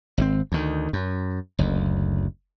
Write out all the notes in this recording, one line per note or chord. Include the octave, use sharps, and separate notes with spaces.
G#1 B2 C4
D2 D#3
F#2
F#1 D2